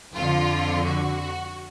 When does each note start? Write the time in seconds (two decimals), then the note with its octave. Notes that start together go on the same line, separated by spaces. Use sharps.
0.15 F2 D3 F4
0.85 F#4